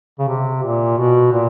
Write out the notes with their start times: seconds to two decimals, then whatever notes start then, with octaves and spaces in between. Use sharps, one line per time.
0.19 C#3
0.28 C3
0.63 A#2
0.97 B2
1.33 A#2